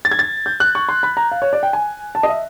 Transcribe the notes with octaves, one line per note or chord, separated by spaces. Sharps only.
A6
G#6
A6
G6
F#6
C#6
C6
B5
A#5
F5
C#5
D5
G5
G#5
A5
D#5
E5